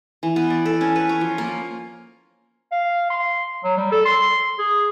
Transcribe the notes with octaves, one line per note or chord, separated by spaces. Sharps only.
E3
B3
D5
A4
C#4
B4
C#5
F3
A#3
F5
C6
F#3
G3
A4
C6
G#4